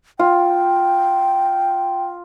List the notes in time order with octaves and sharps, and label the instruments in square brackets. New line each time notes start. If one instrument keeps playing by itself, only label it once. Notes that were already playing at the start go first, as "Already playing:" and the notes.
[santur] F4 [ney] G5